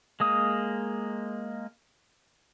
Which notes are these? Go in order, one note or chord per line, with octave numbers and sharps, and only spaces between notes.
G#3 A#3 D#6